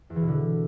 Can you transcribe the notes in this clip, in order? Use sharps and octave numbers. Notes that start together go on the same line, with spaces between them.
E2
E3
B2
D3